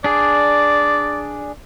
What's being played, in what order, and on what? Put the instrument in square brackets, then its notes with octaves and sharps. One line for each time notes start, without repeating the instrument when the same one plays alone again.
[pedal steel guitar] D4 G#4 [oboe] D5